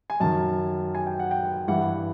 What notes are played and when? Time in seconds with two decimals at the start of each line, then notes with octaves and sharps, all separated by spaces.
0.10 G#5
0.20 F#2 D#3 A5
0.95 G#5
1.07 G5
1.19 F#5
1.31 G5
1.68 G2 E3 F#5